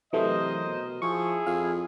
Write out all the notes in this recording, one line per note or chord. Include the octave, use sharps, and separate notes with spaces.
C3 E3 F#3 A3 A#4 C5 D#5
B2
F3 E4 G#4 C#6
F2 F5